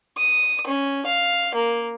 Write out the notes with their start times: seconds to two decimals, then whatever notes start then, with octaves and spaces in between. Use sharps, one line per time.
0.18 D#6
0.67 C#4
1.06 F5
1.55 A#3